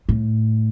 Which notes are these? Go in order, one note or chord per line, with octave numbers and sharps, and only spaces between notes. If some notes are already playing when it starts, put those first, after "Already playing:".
A2